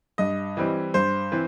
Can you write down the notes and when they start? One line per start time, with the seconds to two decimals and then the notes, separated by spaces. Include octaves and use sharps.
0.18 G2 D#5
0.57 E3 G3 C4
0.94 G2 C5
1.32 E3 C4